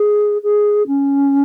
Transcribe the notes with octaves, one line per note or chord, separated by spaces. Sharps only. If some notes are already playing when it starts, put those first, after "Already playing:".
Already playing: G#4
G#4
C#4